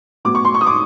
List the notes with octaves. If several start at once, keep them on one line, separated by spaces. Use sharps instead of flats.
A2 F#3 B3 D6
C#6
C6
C#6
D#6
D6